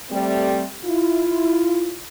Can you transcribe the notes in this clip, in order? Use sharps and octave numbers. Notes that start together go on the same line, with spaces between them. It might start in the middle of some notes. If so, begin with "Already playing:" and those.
G3 A3 C4
E4 F4